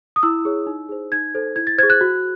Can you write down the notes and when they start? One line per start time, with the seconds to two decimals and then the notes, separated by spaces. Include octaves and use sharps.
0.16 D#6
0.23 E4 E6
0.45 G#4 C#5
0.67 D#4
0.89 G#4 C5
1.12 D#4 G#6
1.35 A4 C5
1.56 E4 G#6
1.67 A6
1.78 G#4 C5 G#6
1.90 F#6
2.01 F#4